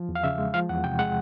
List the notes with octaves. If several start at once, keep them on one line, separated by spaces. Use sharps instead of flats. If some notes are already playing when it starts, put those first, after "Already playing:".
Already playing: F3
E2
F5
C#3 E5
G#3
F3 F5
E2 F#5
C3 G5
G#3 F#5